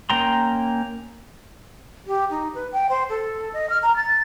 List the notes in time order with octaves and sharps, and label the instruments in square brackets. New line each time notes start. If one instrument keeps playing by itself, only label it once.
[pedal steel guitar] A#3 C#4 G5 A#5 C6
[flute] G4
D#4
B4
G5
C5
A4
D#5
F6
A#5
A6